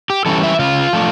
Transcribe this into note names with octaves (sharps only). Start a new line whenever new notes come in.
G4
E3 G3 C#4 A4
E5
C#3 F4
F3 A3 D4